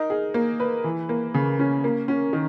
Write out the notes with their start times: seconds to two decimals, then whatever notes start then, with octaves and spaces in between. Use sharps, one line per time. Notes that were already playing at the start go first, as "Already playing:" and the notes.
Already playing: D#4 A#4
0.10 G#4
0.34 A#3
0.60 B4
0.84 E3
1.09 A#3
1.34 C#3
1.59 C#4
1.84 A#3
2.08 C#4
2.33 D#3